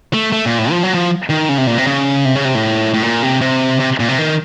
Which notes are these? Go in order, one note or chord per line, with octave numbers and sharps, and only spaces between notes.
A3
A3
A#2
A2
F3
F#3
F3
D#3
C#3
C3
A#2
C3
C#3
C3
C#3
C3
A2
A2
A#2
C3
C3
C3
A#2
C3
D#3